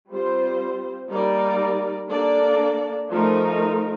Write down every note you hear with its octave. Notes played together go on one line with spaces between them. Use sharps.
G3 C4 F4 C5
G3 A#3 D#4 A#4 D5
A#3 D4 A4 D5
F3 A3 D#4 A#4